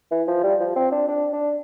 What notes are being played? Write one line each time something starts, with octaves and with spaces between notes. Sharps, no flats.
E3
F3
G3
F3
C4
D4
D4
D4